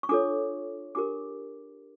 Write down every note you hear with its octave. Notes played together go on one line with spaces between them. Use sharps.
C#6
D4 F4 A4 C#5 D6
D4 G4 A#4 D6